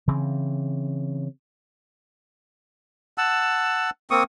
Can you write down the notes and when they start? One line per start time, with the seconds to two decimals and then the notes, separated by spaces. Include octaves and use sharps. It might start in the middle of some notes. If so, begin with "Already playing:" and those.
0.08 C#3 E3 C4
3.18 F#5 A5 E6
4.11 A#3 C4 C#6 D#6